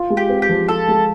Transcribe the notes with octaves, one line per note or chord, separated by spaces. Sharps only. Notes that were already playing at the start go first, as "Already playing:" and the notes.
Already playing: F4
G#3
G4
C4
G4
F3
F4 A4
G#3